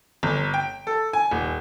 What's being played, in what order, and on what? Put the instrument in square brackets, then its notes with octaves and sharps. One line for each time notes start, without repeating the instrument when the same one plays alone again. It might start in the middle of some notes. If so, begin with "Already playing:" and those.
[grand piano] G1
G5
A4
G#5
D#1